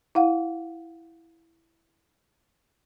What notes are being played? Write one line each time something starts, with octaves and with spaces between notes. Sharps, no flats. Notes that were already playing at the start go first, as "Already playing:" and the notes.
E4 F5 F#5